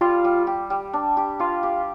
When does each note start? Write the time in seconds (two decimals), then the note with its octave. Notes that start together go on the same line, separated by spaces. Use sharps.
0.01 G3 F4
0.24 G3
0.47 G4
0.70 G3
0.93 D4
1.17 G4
1.40 F4 F5
1.63 G4